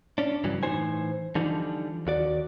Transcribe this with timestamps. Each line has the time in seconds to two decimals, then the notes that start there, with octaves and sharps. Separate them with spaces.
0.18 C#4 D4
0.44 G2 C#3 E3 F#3
0.63 A2 E3 D4 D#4 C5 G#5
1.35 D3 E3 F3 G3 D#4
2.07 D#2 F#4 D5